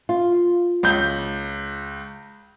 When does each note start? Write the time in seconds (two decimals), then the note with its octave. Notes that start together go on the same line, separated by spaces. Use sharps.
0.09 F4
0.83 C#2 G6